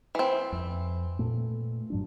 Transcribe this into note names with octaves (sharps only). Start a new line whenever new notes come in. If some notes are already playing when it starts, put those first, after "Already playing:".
E3 C4
F2
A#2 A3
G2 F#3 D4